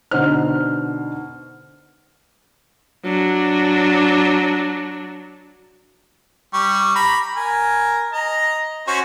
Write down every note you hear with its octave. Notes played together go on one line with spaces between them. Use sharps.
B2 D3 D#4 C5 F6
F#3 D4
G3 C#6
A#5 B5
A#4 G#5
D#5 A#5
C#4 F#4 C5